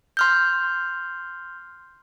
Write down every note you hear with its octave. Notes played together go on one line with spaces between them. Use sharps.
C6 F6 G6